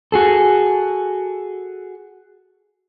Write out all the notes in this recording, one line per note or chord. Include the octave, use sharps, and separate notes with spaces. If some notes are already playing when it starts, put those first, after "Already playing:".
F#4 G#4 A4